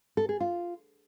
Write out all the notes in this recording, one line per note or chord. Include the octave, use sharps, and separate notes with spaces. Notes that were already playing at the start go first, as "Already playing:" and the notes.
A4
G#4
F4